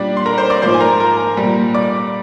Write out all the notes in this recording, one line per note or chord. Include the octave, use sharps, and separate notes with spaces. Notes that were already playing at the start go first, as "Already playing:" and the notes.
Already playing: A#2 G3 D4 D5
C6
A#4 A#5
C5 C6
D5 D6
G#2 F3 C5 C6
G#5
A#4 A#5
A#4 A#5
A#2 G3
D5 D6